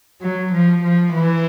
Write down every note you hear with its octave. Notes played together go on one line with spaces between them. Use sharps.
F#3
F3
F3
E3